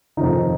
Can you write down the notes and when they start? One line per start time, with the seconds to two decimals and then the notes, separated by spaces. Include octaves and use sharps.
0.17 F2 C3 D#3 D#4